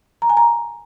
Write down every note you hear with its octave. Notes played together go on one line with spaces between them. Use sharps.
A#5
G#5
A#5